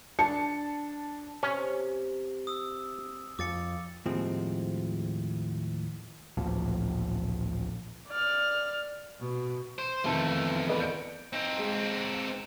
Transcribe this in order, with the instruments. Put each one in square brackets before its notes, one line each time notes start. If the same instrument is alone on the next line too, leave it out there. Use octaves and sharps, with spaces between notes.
[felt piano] D4 A5 C#7
[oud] C3 [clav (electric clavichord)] C#4
[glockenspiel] D#6 E6
[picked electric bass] F2 [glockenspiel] D6 A6 C#7
[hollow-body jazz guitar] D#2 A2 F3 G#3 C4
[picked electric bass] A1 D2 A#2 F3
[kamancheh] D5 F6
[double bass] B2
[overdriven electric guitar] C5
[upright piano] F1 D#3 A5 [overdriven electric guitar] E2 A3
[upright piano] B4 D5 D#5
G6 C#7 D7
[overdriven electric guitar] C4 D#4
[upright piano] G#3